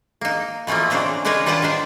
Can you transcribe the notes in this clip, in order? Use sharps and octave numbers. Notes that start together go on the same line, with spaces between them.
A#3 D#4
B2 E3 F3 A3 A#3
C#3 C4 D4 D#4 A#5
G#3 D4 D#4 A#4 B4 C#5
G3 F4 B4 F#5 G5 A5
D#3 D4 C5